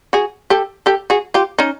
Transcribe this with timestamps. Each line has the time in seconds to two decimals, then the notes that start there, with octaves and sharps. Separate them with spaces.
0.13 F#4 G#4
0.50 G4 A4
0.86 G4 A4
1.10 F#4 G#4
1.34 F4 G4
1.58 C#4 D#4